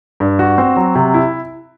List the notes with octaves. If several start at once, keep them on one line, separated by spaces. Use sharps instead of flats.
G2
F#4
C4
F#3
C3
E4